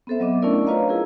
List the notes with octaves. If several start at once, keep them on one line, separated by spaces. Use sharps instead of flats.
B3 C4 A4 C5 E5
F#3 B3 D#5 D6
A3 C#4 D4 E4 A#4 D5
F4 B4 C#5 D#5 F5 A#5
E4 G#4 A#4